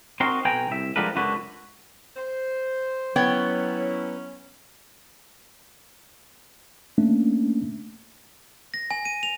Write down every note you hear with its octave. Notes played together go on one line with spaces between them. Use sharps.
C4 D#4 F#4 A#4 C6
B1 B4 G5 G#5 A#5
C2 E5
D3 F3 G3 G#3 A#4 B4
C#2 F#2 D3 F#4 B4
C5
F#3 B3 C#4 E4 C#5 G5
A3 A#3 C#4 D4
A#6
G#5
D#7
F7